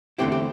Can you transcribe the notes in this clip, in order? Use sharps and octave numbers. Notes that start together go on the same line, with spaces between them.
E2 D3 A3 C4 E4 G4
G4